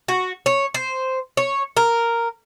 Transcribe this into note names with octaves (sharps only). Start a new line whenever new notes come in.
F#4
C#5
C5
C#5
A#4